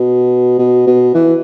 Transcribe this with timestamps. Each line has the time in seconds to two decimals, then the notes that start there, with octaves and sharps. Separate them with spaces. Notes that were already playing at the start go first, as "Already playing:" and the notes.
Already playing: B2
0.58 B2
0.87 B2
1.14 E3